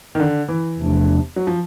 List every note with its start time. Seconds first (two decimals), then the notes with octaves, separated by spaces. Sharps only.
0.15 D#3
0.20 D3
0.48 E3
0.78 E2 C3 F3 A3 D4
1.36 F#3
1.47 F3